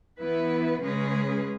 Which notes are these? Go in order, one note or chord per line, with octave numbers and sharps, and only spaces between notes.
E3 B3 E4 B4
C#3 G#3 C#4 G#4 B4